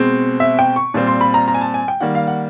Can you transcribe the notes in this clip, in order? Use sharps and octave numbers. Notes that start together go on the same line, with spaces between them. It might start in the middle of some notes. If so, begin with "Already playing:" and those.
Already playing: B2 G#3 C4
E5
G5
C#6
A#2 G3 C4
C6
B5
A#5
A#5
G#5
A5
G#5
G5
D#3 G3 A#3 F#5
F5
F#5